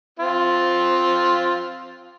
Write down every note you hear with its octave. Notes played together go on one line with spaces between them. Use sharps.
C4 F4